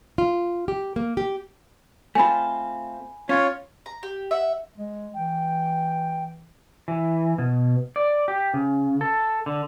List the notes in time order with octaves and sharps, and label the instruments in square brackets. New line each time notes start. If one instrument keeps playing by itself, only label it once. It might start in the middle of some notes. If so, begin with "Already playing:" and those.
[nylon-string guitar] F4
G4
A#3
G4
[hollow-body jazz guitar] A3 C4 F4 [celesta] G#5 B5
[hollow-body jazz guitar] C#4 [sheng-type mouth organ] F4 C#5
[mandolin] A#5
G4
E5 F#5
[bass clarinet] G#3
[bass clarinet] E3 [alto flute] G5
[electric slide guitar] E3
B2
D5
G4
C#3
A4
D3